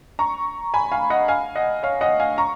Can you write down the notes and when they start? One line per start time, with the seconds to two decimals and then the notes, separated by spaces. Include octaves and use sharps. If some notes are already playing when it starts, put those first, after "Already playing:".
0.19 A#5 C#6
0.74 G#5 B5
0.92 F5 G#5
1.10 D#5 F#5
1.28 F5 G#5
1.55 D#5 F#5
1.83 C#5 F5
2.01 D#5 F#5
2.20 F5 G#5
2.38 A#5 C#6